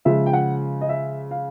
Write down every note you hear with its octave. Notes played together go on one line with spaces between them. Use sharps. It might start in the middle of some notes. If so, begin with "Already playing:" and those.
C#3 F3 G#3 E5
G5
F#5
D#5
E5
F5